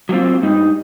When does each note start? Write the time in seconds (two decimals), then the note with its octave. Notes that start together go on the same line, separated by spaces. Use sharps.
0.09 F#3 A3 A#3 C4 F4
0.42 G2 G3 D#4